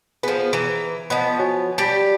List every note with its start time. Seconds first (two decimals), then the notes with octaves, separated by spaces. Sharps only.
0.23 F3 B3 G#4 B4
0.53 E3 A#5
1.10 F3 B3 D#5 F#5 B5
1.39 F#4 C#5 G#5
1.78 G3 G4 A5